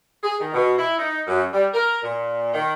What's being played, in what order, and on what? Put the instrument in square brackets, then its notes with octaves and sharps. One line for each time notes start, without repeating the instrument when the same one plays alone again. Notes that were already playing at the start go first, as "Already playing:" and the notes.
[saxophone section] G#4
D#3
B2
E4
D#4
F#2
G3
A#4
A#2
D#3